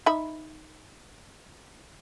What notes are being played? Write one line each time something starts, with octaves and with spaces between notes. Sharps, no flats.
D#4 E5 B5